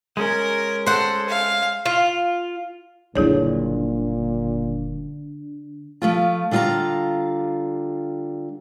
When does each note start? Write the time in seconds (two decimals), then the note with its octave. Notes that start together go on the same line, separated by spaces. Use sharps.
0.17 G#3 C#4 A#4
0.86 A4 C5 F#5
1.29 F5
1.86 F4
3.15 F#1 A#2 D3 G3 D4 E4 G#4 C#5
6.02 F3 A3 F4
6.51 D3 G3 F4 D#5 A5 A#5